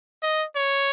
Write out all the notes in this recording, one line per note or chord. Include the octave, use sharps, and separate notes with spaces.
D#5
C#5